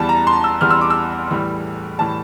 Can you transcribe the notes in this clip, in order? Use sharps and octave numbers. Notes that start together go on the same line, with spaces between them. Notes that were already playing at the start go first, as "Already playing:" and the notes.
Already playing: E2 E3 G3 A5
A#5
C6
E6
E2 E3 G3 F6
E6
D6
E6
A2 E3 G3
A2 E3 G3 A5